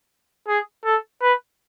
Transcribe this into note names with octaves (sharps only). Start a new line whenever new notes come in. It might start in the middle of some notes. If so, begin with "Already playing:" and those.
G#4
A4
B4